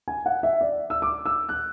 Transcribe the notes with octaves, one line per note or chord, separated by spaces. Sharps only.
G#5
F#5
E5
D5
E6
D6
E6
F#6